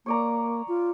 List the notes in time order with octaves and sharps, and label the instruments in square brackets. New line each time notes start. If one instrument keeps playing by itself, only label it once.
[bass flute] A#3 [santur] C#5 D5 A#5
[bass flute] F4